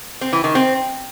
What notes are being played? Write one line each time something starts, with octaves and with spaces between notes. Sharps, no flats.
C4
E3
D#3
C4